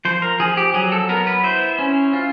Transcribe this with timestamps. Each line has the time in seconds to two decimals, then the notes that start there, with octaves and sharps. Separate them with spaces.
0.05 F3 C5
0.22 A#4
0.40 F3 G#4
0.57 G4
0.74 F#3 G#4
0.92 A4
1.09 B3 A#4
1.27 B4
1.44 E4 C5
1.79 C#4
2.13 F4